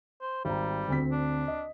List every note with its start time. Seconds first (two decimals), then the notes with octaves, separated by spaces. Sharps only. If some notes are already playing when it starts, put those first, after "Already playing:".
0.21 C5
0.45 G#1 G3 A#5
0.88 D2 C4 B6
1.12 D4
1.48 D#5